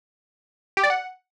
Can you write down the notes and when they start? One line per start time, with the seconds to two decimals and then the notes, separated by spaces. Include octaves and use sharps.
0.77 G4
0.83 D5
0.90 F#5